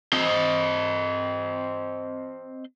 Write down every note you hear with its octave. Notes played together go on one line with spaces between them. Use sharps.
C4 D#5